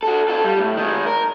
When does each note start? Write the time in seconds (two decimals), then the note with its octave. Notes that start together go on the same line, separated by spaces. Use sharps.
0.03 F#4 A4
0.29 F4 A4
0.45 G3
0.59 A2
0.77 D#3 G#3
1.06 A#4